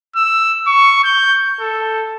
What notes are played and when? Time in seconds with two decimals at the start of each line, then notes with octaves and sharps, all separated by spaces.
0.16 E6
0.67 C#6
1.04 G6
1.61 A4